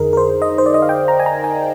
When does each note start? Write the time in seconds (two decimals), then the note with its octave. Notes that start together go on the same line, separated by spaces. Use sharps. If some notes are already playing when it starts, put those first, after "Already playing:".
Already playing: F2 D3 D#4 G#4 A#4
0.13 A#4
0.17 C5
0.42 D#5
0.58 C5
0.66 D5
0.74 D#5
0.82 F5
0.89 G5
1.08 A#5
1.20 G#5
1.26 A#5
1.44 G#5